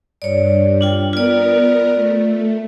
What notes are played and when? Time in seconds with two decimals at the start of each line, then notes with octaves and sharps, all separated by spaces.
0.22 G2 C#5 D5
0.81 D4 F4 G5
1.13 B3 F4 A#4 D5
1.95 A3